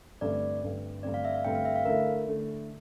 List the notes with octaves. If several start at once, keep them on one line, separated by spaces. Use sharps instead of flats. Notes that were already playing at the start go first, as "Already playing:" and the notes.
G2 D3 A3 C4 D5
G2 D3 A3 C4
G2 D3 A3 C4 D5
F5
E5
F5
G2 D3 A3 C4 G5
F5
E5
F5
D3 A3 E4 A#4
D3 A3 E4